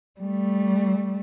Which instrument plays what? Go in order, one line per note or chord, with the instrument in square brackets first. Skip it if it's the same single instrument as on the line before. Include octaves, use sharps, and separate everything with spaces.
[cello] G3 A3